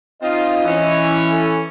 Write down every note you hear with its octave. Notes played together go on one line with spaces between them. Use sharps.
C4 D#4 F4 D#5
E3 C#4
A4